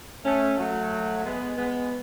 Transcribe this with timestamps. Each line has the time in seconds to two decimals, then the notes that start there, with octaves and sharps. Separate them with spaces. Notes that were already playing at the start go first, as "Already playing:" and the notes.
0.25 A3 C#4
0.58 F#3 A3
1.25 G#3 B3
1.58 G#3 B3